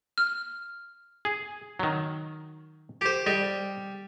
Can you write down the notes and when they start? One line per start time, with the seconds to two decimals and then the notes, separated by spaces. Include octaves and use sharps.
0.18 F6
1.25 G#4
1.79 D#3 F#3
3.01 G4 C5
3.26 G3 D#5